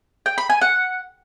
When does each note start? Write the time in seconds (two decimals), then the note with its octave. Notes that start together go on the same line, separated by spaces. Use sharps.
0.26 G5
0.38 B5
0.50 G#5
0.61 F#5